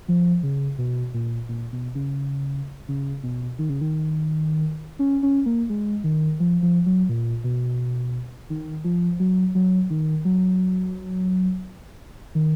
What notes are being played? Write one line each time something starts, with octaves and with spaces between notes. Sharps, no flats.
F3
C#3
B2
A#2
A#2
B2
C#3
C#3
B2
D#3
C#3
D#3
C#4
C#4
A#3
G#3
D#3
F3
F3
F#3
A#2
B2
D#3
F3
F#3
F#3
D#3
F#3
D#3